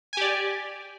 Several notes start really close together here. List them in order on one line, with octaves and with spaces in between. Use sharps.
G#5 G4 D5